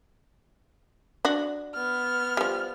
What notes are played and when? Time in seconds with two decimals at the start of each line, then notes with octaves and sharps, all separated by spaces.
1.25 D4 F#4
1.74 B3 F6
2.37 F3 G3